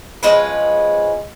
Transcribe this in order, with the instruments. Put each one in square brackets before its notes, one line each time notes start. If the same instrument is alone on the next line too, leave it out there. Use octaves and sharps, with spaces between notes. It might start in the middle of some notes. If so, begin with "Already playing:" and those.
[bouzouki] F3 G#3 C#4 B4